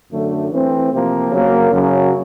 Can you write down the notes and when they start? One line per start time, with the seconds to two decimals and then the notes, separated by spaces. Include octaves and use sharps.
0.12 F#2 D3 F#3 A3
0.52 E3 A3 C4
0.91 C3 F3 A#3
1.31 C#3 F#3 A#3
1.72 F#2 C#3 F#3